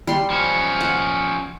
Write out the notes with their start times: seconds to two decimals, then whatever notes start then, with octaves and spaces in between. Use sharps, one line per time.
0.07 G3 C6
0.30 F3 C#4
0.81 F#5